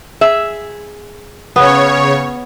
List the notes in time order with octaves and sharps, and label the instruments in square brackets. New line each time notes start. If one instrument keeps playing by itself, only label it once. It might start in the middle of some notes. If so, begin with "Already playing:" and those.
[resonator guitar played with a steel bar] G#4 E5
[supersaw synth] C#3 C#5 [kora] B3